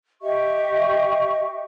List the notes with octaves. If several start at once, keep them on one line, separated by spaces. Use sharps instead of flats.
G4 D#5 E5 C#6